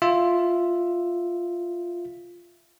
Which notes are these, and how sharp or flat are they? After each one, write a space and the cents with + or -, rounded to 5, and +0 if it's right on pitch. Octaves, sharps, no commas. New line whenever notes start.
F4 +0 E5 +0